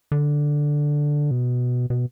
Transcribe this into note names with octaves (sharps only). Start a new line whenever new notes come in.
D3
B2
B2